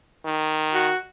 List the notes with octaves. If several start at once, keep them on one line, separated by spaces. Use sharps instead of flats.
D#3
F#4